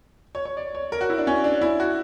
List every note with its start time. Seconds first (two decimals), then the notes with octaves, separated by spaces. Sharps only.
0.35 C#5
0.45 C#5
0.57 D5
0.75 C#5
0.92 A#4
1.01 F#4
1.10 E4
1.18 D4
1.27 C#4
1.44 D4
1.61 E4
1.80 F#4